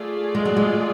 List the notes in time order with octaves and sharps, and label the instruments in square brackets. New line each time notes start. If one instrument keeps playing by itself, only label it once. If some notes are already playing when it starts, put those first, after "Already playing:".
Already playing: [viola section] A3 F4 G#4 D5
[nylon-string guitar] G#3
F#3
G#3